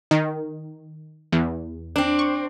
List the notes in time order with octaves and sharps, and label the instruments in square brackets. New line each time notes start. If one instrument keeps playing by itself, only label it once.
[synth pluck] D#3
E2
[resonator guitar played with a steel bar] C4 D4
[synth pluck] C#6